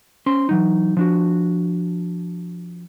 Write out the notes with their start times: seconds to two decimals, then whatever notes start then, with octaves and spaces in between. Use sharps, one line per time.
0.26 C#4 C5 C6
0.49 E3 F#3 D#4
0.97 F3 D4 F#4